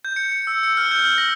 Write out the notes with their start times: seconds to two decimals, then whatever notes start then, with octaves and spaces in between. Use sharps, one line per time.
0.05 G6
0.16 C#7
0.32 C#7
0.47 E6
0.63 C#7
0.77 F6
0.91 G6
1.05 F#7
1.18 A#6